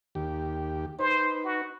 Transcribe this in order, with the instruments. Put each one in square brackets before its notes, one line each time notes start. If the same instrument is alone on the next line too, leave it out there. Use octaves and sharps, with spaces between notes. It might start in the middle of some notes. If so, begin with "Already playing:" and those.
[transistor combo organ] D#2 G4
[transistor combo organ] D#4 B4 [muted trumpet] C5
[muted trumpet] F#4